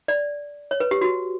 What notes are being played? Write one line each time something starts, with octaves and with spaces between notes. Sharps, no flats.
D5
C#5
B4
G4
F#4